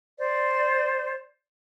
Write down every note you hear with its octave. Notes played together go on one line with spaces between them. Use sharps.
C5 D5